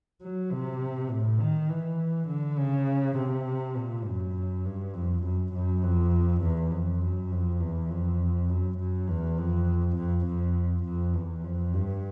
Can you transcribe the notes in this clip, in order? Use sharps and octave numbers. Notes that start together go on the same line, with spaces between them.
F#3
C3
A2
D#3
E3
D3
C#3
C3
A#2
F#2
G2
F2
F#2
F#2
F2
E2
F2
F#2
F2
E2
F2
F#2
F#2
E2
F2
F2
F2
F2
E2
F2
G2